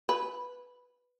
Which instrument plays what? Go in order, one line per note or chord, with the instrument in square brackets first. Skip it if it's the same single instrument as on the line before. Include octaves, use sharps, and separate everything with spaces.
[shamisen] B4